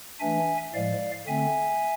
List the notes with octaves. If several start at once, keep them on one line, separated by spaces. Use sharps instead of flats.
E3 A3 D4 E5 G#5
A2 F3 G#3 D5 F5
D3 A3 C4 E5 G#5